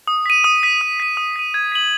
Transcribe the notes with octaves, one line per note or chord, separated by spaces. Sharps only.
D#6
B6 D#7
D#6
B6 D#7
D#6
B6 D#7
D#6
B6 D#7
G#6
B6 D#7 F#7